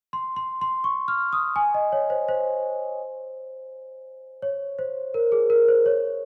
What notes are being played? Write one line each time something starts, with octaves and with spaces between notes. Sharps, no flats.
C6
C6
C6
C#6
F6
D#6
G#5
D#5
C#5
C5
C5
C#5
C5
A#4
G#4
A#4
C5
C#5